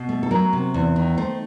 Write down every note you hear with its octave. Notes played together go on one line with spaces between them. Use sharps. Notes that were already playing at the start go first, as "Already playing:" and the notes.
Already playing: B2
A3
A4
F#3 A#4
C3
E2
D#3
A3 C5